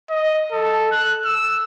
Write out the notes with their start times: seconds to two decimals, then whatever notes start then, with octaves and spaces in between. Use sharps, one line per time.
0.10 D#5
0.52 A4
0.91 F#6
1.25 E6